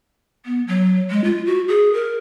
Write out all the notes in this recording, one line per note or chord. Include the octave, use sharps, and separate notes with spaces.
B3
F#3
G#3
F4
F#4
G#4
A#4